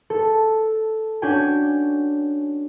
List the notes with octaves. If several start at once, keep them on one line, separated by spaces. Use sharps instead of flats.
A4
C#4 D4 F#4 G5 G#5